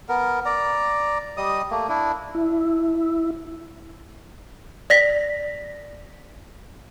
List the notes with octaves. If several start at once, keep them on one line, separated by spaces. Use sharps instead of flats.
B3 A#4
D5 A#5
G3 D#5 D#6
A3 A#3
D4 E4
E4
D5 A#6 B6